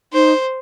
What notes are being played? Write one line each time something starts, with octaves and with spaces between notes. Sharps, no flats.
D#4 C5